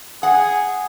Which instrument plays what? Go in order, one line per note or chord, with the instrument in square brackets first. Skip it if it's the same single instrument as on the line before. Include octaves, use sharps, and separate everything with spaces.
[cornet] G#4 [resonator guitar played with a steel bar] F#5